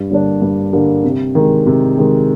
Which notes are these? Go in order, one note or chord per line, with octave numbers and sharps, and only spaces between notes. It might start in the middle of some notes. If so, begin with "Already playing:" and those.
Already playing: G2
D3 G3 A#3 D4
G2
D3 G3 A#3 D4
C3
D#3 G#3
C3
D#3 G#3